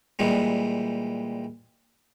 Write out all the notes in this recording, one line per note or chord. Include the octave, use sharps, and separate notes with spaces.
A#2 E3 G3 G#3